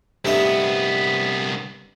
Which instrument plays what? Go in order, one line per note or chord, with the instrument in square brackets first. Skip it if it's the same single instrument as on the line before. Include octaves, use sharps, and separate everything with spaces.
[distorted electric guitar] C2 B3 [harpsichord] G2 A3 D#5